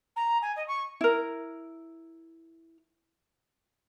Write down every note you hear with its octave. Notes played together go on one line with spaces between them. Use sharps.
A#5
G#5
D#5
C#6
E4 A#4